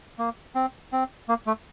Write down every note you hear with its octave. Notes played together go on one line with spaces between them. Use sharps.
A#3
C4
C4
A#3
A3